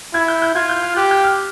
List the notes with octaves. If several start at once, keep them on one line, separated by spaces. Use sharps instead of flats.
E4 G#6
G6
G6
F4 G#6
G6
F6
G4 F#6
G6
F6